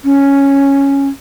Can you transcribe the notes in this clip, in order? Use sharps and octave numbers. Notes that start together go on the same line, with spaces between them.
C#4